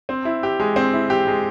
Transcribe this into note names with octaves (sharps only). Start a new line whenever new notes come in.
C4
E4
G4
G#3
C4
E4
G4
G#3